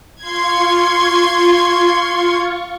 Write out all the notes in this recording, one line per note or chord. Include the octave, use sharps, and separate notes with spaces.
F4 C6 C#6 G#6